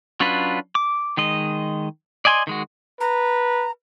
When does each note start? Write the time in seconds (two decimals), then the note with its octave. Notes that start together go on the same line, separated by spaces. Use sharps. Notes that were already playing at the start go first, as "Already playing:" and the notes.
0.20 F#3 C#4 D4 F4 B4
0.75 D6
1.17 D#3 G#3 D#5
2.25 D5 D#5 G#5 B5 C6
2.47 D#3 G#3 F#4
3.01 B4 A#5